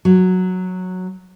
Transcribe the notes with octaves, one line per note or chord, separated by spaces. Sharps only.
F#3